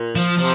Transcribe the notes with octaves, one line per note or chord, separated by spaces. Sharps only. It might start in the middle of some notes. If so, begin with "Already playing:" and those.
Already playing: A#2
F3
C3 F3